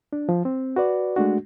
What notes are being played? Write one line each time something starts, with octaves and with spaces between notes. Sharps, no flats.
D4
F3
C4
F#4 B4 D5
G#3 A3 D4 F#4